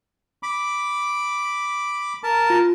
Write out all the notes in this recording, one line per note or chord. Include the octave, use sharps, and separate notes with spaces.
B5 D6
A#4 A5
F4